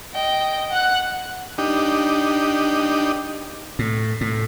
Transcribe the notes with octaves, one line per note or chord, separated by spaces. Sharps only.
D#5 G5
F#5 F#6
D4 D#4 G4
A2
A2